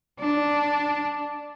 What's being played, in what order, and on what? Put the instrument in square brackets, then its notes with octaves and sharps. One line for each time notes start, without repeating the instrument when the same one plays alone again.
[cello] D4